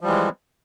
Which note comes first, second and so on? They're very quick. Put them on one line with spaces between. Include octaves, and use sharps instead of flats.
F3 G3 E3 G#3